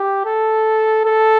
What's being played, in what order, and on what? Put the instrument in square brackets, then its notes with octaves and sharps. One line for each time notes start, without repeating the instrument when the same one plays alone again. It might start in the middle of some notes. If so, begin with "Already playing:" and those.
Already playing: [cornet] G4
A4
A4